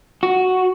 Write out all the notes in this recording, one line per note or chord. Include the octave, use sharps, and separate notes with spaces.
F#4